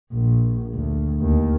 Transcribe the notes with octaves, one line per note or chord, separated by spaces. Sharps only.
A#1
D2
D#2